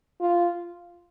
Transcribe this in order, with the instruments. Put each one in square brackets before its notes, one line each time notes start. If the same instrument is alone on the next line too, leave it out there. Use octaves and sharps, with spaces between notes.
[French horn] F4